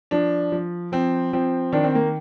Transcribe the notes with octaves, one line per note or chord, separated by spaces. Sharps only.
F3 D4
F3
F3 C4
F3 C4
D#3 D4
C4
A#3